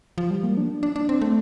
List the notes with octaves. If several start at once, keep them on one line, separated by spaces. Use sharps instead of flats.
F3
G3
A#3
D4
D4
D4
C4
A3